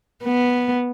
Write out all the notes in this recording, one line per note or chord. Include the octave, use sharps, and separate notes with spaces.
B3